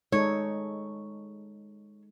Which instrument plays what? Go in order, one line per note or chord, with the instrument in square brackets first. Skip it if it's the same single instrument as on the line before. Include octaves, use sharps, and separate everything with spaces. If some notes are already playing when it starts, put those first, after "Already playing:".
[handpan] G#3 D#4 A4 [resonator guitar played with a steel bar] C#5